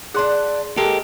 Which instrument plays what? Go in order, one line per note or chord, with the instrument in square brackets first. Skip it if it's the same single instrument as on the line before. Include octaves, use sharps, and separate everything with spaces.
[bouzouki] D4 F#5 [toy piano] G#4 C6
[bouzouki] G#3 A#3 [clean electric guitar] G4 A4 A#4